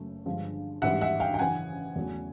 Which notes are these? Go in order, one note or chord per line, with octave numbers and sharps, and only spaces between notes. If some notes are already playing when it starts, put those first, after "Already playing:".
Already playing: F#1 F#2 C#3 F#3 A3
G1 G2 D3 F3 G#3
A1 G#2 E3 G3 E5 F#5
E5 F#5
F5 G5
G5
F#2 C#3 E3 F#5 G#5
E2 C#3 F#3 A3